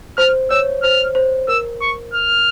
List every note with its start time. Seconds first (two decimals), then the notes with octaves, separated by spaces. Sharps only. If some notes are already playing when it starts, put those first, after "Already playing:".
0.17 C5 F6
0.50 C#5 E6
0.83 C5 F6
1.15 C5
1.48 A#4 E6
1.81 C#6
2.13 F6